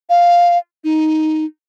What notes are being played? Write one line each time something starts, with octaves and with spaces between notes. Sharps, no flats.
F5
D#4